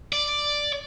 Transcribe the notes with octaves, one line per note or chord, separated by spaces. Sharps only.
D5